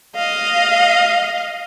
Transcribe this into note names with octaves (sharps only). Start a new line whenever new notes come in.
D#5 F5